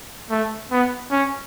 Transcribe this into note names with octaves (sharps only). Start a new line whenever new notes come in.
A3
B3
C#4